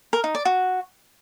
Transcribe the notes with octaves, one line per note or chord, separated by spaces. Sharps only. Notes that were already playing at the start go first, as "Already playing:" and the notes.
A#4
D#4
D5
F#4